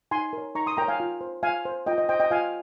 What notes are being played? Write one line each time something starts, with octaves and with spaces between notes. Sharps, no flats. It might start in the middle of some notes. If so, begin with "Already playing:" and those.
D#4 G#5 C6
A#4 C#5
D#4 A#5 C#6
C6 D#6
A#4 C#5 G5 A#5
F5 G#5
F4
C5
F4 F5 G#5
C5
F4 D#5 G5
D#5
C5 D#5 G5
D#5 G5
F4 F5 G#5